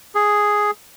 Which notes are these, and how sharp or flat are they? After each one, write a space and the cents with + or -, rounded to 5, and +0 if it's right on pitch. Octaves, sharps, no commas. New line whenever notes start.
G#4 +0